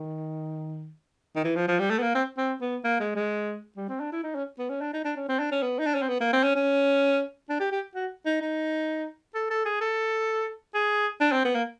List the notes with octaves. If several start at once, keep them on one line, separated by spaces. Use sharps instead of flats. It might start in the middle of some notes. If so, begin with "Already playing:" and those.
Already playing: D#3
D#3
E3
F3
F3
G3
A3
B3
A#3
C4
C4
B3
A#3
G#3
G#3
G3
C4
D4
E4
D#4
C#4
B3
C#4
D4
D#4
D4
C#4
C4
D4
C#4
B3
D#4
D4
C#4
C4
B3
A#3
C4
C#4
C#4
D4
G4
G4
F#4
D#4
D#4
A4
A4
G#4
A4
G#4
D4
C4
B3
A#3